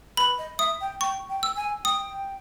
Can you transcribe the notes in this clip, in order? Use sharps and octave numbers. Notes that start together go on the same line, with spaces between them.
B4 B5
D#5
E5 D#6
G5
G5 C#6
G5
E6
G#5
G5 D#6